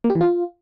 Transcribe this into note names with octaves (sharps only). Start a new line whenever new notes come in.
A#3
G4
E3
F4